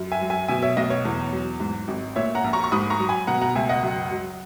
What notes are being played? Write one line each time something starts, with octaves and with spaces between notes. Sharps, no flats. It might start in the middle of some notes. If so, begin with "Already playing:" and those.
Already playing: F#2
E5 G#5
F#3
E5 G#5
B2 E5 G#5
C#5 E5
B1 D#5
C#5
E2
F#3
G#2
G#1
A#2 C#5 E5
F#5 A#5
A#1
A#5 C#6
C#6
G#2 B5 D#6
A#5 C#6
F#3
G#5 B5
B2 F#5 A#5
F#5 A#5
C#2 E5 G#5
D#5 F#5
F#2
F#3